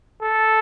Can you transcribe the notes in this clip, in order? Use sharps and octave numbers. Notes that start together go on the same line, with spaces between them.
A4